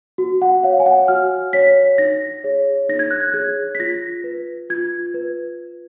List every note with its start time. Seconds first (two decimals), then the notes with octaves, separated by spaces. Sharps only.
0.18 F#4
0.42 F#5
0.63 C#5 F5
0.80 G#5
0.86 F#5
1.08 F#4 F6
1.53 C#5 B6
1.98 D#4 A#6
2.44 G#4 C#5
2.89 D#4 A#6
2.99 G#6
3.11 F#6
3.21 G#6
3.34 G#4 G#6
3.39 C#5
3.75 B6
3.79 F4 A#6
4.24 B4
4.69 F4 G#6
5.14 B4